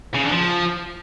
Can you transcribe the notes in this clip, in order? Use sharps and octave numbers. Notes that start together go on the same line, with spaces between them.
C#3
D3
F3